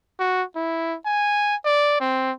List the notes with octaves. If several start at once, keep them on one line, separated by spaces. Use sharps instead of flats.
F#4
E4
G#5
D5
C4